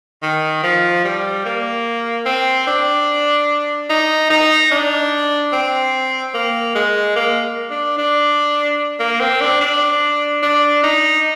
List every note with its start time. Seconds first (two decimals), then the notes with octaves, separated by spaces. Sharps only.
0.22 D#3
0.63 F3
1.05 G3
1.45 A#3
2.26 C4
2.67 D4
3.90 D#4
4.30 D#4
4.71 D4
5.53 C4
6.34 A#3
6.75 G#3
7.16 A#3
7.70 D4
7.98 D4
9.00 A#3
9.20 C4
9.41 D4
9.61 D4
10.43 D4
10.84 D#4